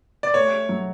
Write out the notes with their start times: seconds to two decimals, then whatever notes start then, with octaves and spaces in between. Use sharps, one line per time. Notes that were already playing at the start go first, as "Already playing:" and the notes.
0.23 D5
0.34 A3 C#5
0.69 F#3